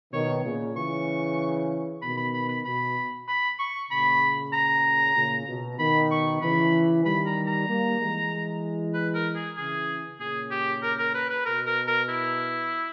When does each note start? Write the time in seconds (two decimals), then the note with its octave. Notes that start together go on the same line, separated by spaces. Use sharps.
0.13 B2 D#3 C#5
0.45 A#2 C#3
0.76 C#3 E3 C#6
2.02 B2 D#3 B5
2.17 B5
2.34 B5
2.49 B5
2.65 B2 B5
3.28 B5
3.59 C#6
3.91 A#2 C#3 B5
4.53 A#5
5.16 A#2 C#3
5.48 B2
5.79 B2 D#3 B5
6.11 C#6
6.42 C#3 E3 B5
7.05 D#3 G3 B5
7.26 A#5
7.47 A#5
7.68 G3 A#3
8.00 E3 G#3
8.94 B4
9.14 A#4
9.36 G#4
9.57 C#3 E3 G#4
10.19 A#2 C#3 G#4
10.51 G4
10.82 A#4
10.98 A#4
11.15 B4
11.30 B4
11.45 B2 A#4
11.66 A#4
11.87 A#4
12.09 E4